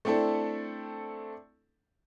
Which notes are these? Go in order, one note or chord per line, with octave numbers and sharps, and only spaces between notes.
A3 C4 D4 E4 A4